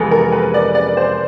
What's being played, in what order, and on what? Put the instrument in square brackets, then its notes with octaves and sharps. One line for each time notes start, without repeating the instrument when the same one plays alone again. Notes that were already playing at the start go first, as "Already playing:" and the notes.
Already playing: [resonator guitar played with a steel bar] F2 C3 E3 G#3 B3 [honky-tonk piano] G#4 A4
[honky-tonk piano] A#4
B4
D5
D5
C5